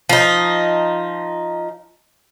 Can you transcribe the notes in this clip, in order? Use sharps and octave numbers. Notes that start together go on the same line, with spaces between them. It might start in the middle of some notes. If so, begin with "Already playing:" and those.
F3 D#4